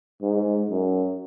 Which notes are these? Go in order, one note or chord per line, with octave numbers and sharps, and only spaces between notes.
G#2
F#2